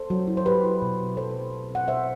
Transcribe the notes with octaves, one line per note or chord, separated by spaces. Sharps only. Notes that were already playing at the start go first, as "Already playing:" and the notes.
Already playing: A4 C5
F#3
E4
C5
F#3 G4 B4
E4
B2
C4
F#3 A4 C5
F#3
B2
C4 F#5
B2 C5 E5